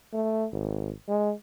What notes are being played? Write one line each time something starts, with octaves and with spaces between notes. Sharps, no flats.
A3
G#1
G#3